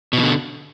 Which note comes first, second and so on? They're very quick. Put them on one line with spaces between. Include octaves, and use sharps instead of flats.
B2 E3 D3